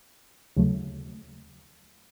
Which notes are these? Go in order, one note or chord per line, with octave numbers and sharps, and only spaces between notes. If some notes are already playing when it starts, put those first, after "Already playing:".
D#2 C#3 F#3 A3